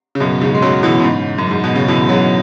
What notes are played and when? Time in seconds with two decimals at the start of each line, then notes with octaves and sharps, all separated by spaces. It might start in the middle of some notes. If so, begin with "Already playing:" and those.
0.15 C#3
0.20 F#2 B2
0.41 G#2 C#3
0.55 G#3
0.62 C#3 F#3
0.83 B2 E3
1.00 B2
1.04 G#2 C#3
1.38 F#2
1.51 G#2
1.64 B2
1.75 C#3
1.88 B2 E3
2.09 C#3 F#3